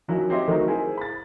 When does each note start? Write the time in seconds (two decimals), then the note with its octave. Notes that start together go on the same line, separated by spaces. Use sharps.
0.08 D#3 F3 F#3 C#4 E4 A#4
0.30 C4 G4 C5 C#5 D#5 E5
0.48 D#3 F#3 A3 D#4 A#4
0.68 E4 G#4 A#4 C5
0.97 B5 A6